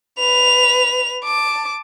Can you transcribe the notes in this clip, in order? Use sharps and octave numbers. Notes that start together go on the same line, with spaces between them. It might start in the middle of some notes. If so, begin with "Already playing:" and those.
B4 F7
A5 D6